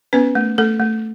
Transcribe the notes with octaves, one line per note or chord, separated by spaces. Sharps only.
B3 C#4 B4
A3
A3 A4
A3